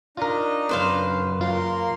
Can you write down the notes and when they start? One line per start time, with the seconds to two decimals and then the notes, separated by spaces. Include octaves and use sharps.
0.17 D4 D#4 F4 A#4 D#5
0.69 F#2 C#3 B4 C5 F5
1.41 A#3 F4 A#4 C6